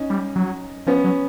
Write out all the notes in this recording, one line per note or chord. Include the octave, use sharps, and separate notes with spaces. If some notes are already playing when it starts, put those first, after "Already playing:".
Already playing: C#4 D#4
G3
F#3
F3 B3 C#4
F#3